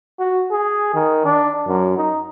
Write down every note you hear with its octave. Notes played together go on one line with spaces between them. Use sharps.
F#4
G#4
D#3
D4
F#2
D#4